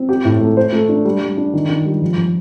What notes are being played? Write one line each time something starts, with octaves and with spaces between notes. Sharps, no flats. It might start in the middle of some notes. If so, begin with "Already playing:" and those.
Already playing: C4
G4
A2
A3
C5
A3
D4
G3
G3
D4
D#3
D#3
G3
F3
F3